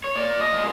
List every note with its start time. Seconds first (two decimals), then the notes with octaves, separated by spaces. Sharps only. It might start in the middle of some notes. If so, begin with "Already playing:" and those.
0.04 C#5
0.16 A#2 D5
0.40 D#5
0.52 F3 G#3